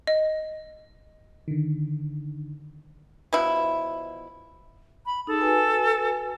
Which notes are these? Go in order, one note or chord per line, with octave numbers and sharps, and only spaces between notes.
D#5
D3 D#3
B2 F3 E4
B5
D#4 G#4 A4
F#4 B4 G#5